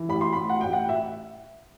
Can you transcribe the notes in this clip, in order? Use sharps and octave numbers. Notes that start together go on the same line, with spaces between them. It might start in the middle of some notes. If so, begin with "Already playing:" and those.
Already playing: E3
A1 B5
C6
A2 B5
F#5
A1 G5
F#5
E5